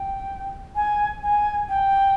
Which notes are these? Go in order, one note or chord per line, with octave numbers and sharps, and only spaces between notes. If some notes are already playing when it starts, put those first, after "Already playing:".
Already playing: G5
G#5
G#5
G5